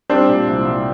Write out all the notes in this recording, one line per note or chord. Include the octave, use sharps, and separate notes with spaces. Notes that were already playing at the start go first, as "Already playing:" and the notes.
G3 C4 D4
A#2
C2
C2